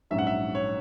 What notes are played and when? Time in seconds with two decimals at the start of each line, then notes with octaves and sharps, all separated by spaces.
0.10 A#1 G#2 F#3 C#4 E5
0.19 F#5
0.27 E5
0.55 C#5